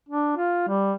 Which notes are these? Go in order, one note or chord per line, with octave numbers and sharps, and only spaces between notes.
D4
F4
G3